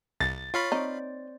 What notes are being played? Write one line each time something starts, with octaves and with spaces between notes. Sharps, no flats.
C2 A6
F4 C#5 F5 B5
C4 D#4 D5